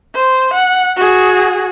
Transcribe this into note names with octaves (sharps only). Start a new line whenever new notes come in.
C5
F#5
F#4 G#4